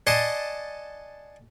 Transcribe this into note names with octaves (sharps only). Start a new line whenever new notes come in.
D5 D#5 F#5 G#5 A5 C6